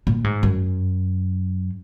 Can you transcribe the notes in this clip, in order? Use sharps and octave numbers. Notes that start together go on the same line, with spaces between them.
A#2
G#2
F#2